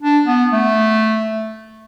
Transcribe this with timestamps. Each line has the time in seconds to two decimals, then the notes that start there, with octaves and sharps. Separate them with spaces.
0.02 D4
0.26 B3
0.53 A3